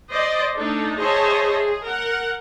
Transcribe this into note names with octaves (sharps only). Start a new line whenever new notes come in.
C5 D5 D#5
A3 D4 D#4 A4
G#4 C5 C#5 D#5 E5 A5
G#4
A#4 F#5